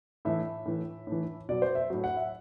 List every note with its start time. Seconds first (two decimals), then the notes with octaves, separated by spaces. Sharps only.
0.25 A2 E3 E5
0.65 A2 E3
1.07 A2
1.12 E3
1.49 B2 F#3 D5
1.62 C5
1.75 E5
1.90 A2 F#3
2.04 F#5
2.17 E5